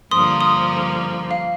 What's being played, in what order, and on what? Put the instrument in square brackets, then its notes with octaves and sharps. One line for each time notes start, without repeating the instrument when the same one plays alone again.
[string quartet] G2 D3 F3 A#3 [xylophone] C6 D#6
[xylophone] C6 D#6
F5